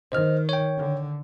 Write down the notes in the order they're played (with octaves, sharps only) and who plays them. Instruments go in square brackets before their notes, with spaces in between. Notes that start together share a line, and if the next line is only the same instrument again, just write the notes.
[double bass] D#3 [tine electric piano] C5 D#5 F6
[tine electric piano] C#5 G5
[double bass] D3